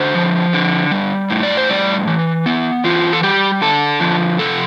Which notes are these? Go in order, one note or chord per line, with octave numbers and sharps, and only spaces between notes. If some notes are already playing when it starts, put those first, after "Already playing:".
Already playing: D3 C5
F3
D3
G3
A2
D5
C5
G3 D5
E3
B3
E3 F4
A4
G3 G4
D3 A4
F3
C3 A4